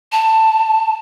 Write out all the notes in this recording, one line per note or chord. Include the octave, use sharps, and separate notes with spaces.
A5